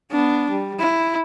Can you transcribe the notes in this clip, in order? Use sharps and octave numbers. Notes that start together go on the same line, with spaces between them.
B3 D4
G3
E4